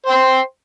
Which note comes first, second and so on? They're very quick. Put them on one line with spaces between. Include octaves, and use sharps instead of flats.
C5 G5 C6